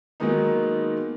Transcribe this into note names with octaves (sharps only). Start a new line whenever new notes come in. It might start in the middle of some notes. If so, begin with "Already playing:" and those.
D#3 F#3 G#3 A#3 B3 D#4